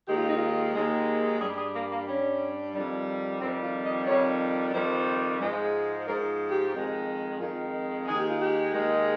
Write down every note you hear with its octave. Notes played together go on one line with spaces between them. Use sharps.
D#2 D#3 G#3 G4
F4
D#4
F4
D#2 D#3 G#3
G2 G3 G#4
G#4
A#3
A#3
G2 G3 C#4
F2 D#3 G3
F2 D#3 G3 C4
F4
D#5
F2 D#3 G3 C#5
F2 D#3 G3 C5
G#2 F3 G#3
G#2 F3 G#3 A#4
G4
F2 D#3 G#3
F2 D#3 G#3 F4
D#2 D#3 G#3 G#4
G4
F4
G4
D#2 D#3 G#3